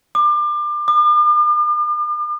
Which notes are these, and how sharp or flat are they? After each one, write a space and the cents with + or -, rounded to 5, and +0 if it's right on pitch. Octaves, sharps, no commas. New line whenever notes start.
D6 +30
D6 +45